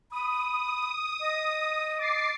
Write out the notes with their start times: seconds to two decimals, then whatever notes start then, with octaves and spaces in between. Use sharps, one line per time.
0.12 B5 D#6
1.21 D#5
1.98 D6 A6 C7